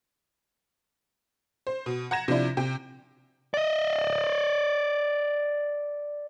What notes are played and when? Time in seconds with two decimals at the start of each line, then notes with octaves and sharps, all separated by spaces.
1.67 C5
1.86 B2
2.11 F#5 A#5 G#6 A#6 E7
2.28 C3 F3 D4 E4
2.57 C3 G5
3.54 D5 D#5